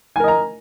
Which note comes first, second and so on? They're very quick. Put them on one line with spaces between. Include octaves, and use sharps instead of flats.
G#5 A#4 D#5 A#5